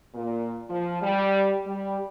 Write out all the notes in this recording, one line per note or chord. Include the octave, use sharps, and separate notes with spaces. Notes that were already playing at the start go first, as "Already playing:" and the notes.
A#2
F3
G3
G3